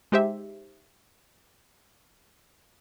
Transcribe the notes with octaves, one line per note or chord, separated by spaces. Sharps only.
G#3 D#4 G4 C5 E5